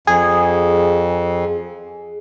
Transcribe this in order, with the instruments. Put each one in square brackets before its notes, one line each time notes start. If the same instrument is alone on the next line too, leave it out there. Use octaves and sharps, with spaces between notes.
[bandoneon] F2 [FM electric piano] G#4